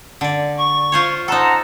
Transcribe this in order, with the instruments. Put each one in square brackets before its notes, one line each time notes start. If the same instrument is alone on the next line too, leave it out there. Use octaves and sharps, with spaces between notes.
[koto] D3 D5
[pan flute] C#6
[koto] F4 C5 C#5
[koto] D#4 A4 [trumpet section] C5 F#5 A#5 [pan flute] A5